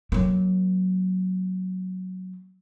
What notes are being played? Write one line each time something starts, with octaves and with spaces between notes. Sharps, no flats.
F#3 A#3